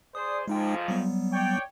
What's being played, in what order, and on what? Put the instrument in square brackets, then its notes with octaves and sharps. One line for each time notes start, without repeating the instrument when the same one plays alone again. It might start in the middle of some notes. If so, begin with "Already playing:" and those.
[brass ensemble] G#4 C5 D5 [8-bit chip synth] D#6
[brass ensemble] F2 G#2 F3 [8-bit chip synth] G#3 D#4 G5
[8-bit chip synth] F#3 G3 B3
[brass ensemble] C#5 D5 G5